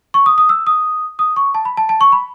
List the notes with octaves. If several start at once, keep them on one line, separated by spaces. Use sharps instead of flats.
C#6
D#6
D#6
E6
D#6
D#6
C#6
A5
B5
A5
A5
C#6
B5